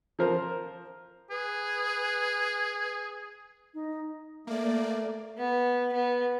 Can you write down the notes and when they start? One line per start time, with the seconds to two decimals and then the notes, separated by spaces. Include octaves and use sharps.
0.19 F3 F4 A#4 C5
1.30 G#4 B4
3.74 D#4
4.47 A3 A#3 D5
5.38 B3
5.92 B3